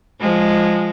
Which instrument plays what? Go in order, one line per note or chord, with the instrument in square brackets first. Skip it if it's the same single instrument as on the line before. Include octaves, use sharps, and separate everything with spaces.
[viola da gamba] F3 G#3